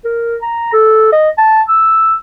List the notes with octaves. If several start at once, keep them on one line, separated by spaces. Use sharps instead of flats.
A#4
A#5
A4
D#5
A5
E6